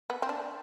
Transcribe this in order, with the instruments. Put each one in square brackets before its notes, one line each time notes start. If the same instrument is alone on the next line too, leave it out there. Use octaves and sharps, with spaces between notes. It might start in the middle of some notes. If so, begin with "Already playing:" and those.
[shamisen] B3
C4
D4